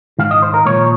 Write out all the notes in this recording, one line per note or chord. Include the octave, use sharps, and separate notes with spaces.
G#2 D#3 F5
D#5
C5
A#4
A#2 F3 C#5